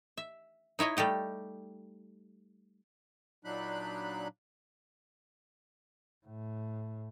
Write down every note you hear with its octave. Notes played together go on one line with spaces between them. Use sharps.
E5
D#4 E4 C#5 D#5
G3 A3 G4 D#5
A#2 F#3 D4 D#4 B5 F#6
A2